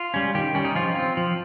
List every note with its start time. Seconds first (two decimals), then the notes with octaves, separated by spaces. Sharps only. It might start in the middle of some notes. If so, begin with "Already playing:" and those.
Already playing: F4
0.14 G3 C#4
0.35 D#3 G4
0.55 G3 C#4
0.65 D#4
0.75 F3 F4
0.96 C4
1.17 F3